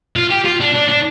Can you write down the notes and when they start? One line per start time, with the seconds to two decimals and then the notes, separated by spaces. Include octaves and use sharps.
0.16 F4
0.30 G4
0.45 F4
0.61 D4
0.75 D4
0.89 D4